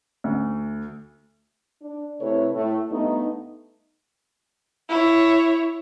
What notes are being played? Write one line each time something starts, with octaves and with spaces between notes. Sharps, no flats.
D2
D4
C3 A3 E4 A4 B4 C#5
A2 A3
G2 A3 B3 D#4
E4 C#5